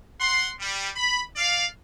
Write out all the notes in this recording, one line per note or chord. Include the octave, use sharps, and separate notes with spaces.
F#5 C6
G3
B5
D5 F5